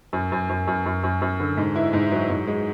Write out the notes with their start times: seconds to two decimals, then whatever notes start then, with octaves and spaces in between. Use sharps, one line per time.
0.13 F#2
0.32 F#2
0.49 F#2
0.67 F#2
0.86 F#2
1.04 F#2
1.22 F#2
1.40 D3
1.57 G#2
1.76 E4
1.93 G#2
2.12 F#3
2.30 G#2
2.47 G#3